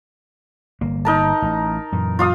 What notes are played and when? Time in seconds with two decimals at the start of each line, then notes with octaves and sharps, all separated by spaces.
0.81 G1 A#3
1.05 D#4 A#4 A5
1.42 A1
1.92 F#2 A#2 E3
2.19 F4 F5 D#6